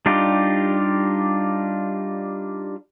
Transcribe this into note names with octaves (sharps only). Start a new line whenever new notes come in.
G3 D4 D#4 F4 G4